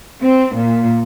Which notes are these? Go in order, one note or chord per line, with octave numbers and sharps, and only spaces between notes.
C4
A#2